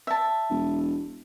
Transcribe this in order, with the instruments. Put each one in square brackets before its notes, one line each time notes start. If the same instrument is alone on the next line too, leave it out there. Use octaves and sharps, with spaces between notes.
[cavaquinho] E5 A5
[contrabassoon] E1